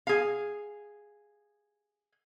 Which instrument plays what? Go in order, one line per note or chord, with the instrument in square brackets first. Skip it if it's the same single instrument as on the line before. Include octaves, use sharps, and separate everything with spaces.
[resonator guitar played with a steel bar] G#4 F5